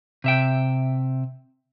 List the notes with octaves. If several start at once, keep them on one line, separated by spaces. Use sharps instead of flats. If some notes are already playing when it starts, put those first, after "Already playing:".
C3 E5 G5